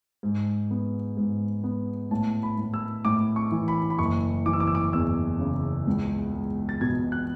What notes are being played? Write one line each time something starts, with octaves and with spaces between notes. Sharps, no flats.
G#2
B3
G#2
B3
A2 A5
B5
A2
E6
A2 D6
C#6
E3
B5
B5
F#1 C#6
E3 D6
E6
D6
E6
D6
E2 E6
C#3
C#2
G#3
A6
B2 G#6
F#6